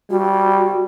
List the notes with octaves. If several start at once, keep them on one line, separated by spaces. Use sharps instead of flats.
G3 F#4